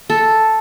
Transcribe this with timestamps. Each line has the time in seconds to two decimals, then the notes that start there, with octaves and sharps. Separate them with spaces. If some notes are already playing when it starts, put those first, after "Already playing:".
0.10 A4